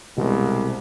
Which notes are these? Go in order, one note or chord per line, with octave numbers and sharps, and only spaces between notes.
C2 B2 G#3